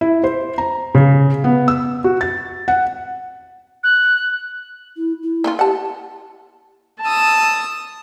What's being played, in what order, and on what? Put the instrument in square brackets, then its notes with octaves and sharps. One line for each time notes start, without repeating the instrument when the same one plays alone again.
[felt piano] E4
C5
A#5
C#3
B3
E6
F#4
A6
F#5
[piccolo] F#6
[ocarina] E4
E4
[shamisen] A#3 C#4 F4
[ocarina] G4 [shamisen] F#5 A5
[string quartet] A5 D#6 E6